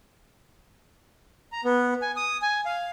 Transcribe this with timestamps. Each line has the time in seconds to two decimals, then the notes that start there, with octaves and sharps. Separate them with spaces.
1.52 A#5
1.64 B3
2.02 G#5
2.16 D#6
2.42 G#5
2.66 F5